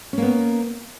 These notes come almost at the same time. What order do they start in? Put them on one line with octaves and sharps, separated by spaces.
C#4 A#3 B3